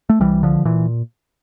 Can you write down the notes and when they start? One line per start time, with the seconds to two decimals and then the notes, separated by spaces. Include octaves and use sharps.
0.10 A3
0.20 C2 E3 G3
0.43 D3 F3
0.65 A#2 E3